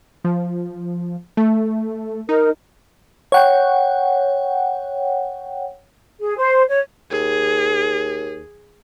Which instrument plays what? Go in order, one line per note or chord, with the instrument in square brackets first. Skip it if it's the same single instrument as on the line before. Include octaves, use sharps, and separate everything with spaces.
[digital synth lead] F3
A3
[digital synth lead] D#4 [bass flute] A#4
[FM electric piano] C#5 F#5 G5
[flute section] G#4
C5
C#5
[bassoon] D#2 [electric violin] G#4